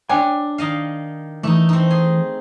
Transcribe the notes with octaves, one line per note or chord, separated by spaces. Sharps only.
D4 C#5 G5 G#5
D#3 D#5 F5
E3 A3 D#4
C4 D#4
G#4